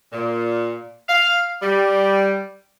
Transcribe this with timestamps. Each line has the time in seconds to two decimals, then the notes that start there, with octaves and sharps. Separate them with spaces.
0.12 A#2
1.09 F5
1.61 G3